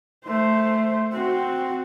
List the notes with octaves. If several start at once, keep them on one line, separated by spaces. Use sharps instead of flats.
A3 C5
C4 F#4